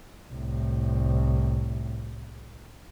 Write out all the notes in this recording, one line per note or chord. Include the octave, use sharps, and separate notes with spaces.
C2 A2